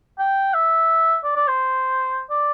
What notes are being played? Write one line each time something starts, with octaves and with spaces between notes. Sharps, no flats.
G5
E5
D5
D5
C5
D5